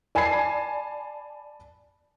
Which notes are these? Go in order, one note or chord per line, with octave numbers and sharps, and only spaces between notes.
D5 G#5 A5 B5 G#6 C7